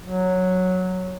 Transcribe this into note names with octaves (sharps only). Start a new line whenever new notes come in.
F#3